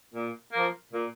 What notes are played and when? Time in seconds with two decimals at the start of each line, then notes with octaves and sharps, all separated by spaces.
0.14 A#2
0.53 F3 A#3
0.92 A#2